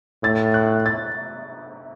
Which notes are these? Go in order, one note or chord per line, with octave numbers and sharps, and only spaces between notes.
A2 A6
F#6
A6